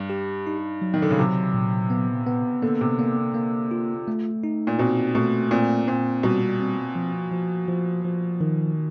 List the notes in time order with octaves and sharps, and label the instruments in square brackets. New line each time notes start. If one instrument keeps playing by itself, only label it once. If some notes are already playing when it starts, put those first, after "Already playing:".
Already playing: [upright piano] G2
[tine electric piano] G4
D#4
F#3
[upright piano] D#3
D3
C#3
[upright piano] C3 [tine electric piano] F#3
[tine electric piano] A#2
B3
B3
[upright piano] D3 [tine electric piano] A#3
[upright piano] C3
[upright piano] D3 [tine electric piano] A#3
[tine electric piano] A#3
F4
A3
D#4
[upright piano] A#2
[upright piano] B2 [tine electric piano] C4
[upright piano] B2 [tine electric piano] A3
[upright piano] A#2 [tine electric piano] C4
[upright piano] A#2 [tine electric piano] C4
[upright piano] B2 [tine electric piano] G3
[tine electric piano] C4
F3
F3
F3
F3
D#3